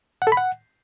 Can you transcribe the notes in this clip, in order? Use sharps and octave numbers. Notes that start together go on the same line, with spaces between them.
F#5
A4
B5
F#5